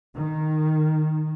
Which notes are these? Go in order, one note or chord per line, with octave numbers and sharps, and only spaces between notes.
D#3